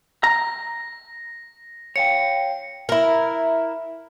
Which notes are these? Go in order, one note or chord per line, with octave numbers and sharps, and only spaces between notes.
A#5 A#6
C#5 F5 G5 C#7
E4 A#4